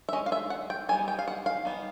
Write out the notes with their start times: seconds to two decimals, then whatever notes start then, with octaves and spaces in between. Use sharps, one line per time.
0.09 E5
0.13 G#3 C#4 D#5
0.26 F5
0.32 E5
0.50 F#5
0.70 G5
0.89 G3 B3 D#4 G#5
1.08 G5
1.19 F5
1.28 F#5
1.46 F5
1.65 G3 B3 D#4